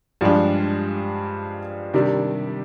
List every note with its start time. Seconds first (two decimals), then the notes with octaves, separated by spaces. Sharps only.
0.21 G2 F3 G#3 D4 G4
1.94 C3 D#3 G3 D4